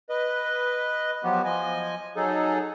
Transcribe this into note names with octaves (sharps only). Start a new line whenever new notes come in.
B4 D#5
F3 F#3 B3 F#4 G4
F3 D#5 G#5
F#3 D#4 G#4 A4